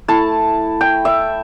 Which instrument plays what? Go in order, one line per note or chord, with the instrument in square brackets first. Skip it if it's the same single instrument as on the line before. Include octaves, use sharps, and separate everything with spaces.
[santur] A3 E4 A5
G5
E5